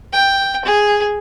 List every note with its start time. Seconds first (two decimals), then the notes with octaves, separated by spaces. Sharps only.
0.13 G5
0.65 G#4